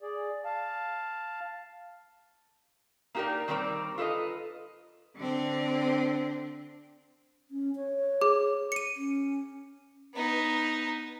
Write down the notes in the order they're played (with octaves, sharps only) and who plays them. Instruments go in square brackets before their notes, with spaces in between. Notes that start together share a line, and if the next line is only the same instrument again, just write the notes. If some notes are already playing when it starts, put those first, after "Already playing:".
[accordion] G#4 D5
F5 A5
[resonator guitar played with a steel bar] A#3 D#4 G4 G#4 A#4 D5
D#3 G3 C4 A#4 D5
F4 A4 B4 D5 D#5
[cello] D3 C4
[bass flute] C#4
C#5
[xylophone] G#4 [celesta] D6
[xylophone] C#7 D#7
[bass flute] C#4
[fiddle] B3 D#4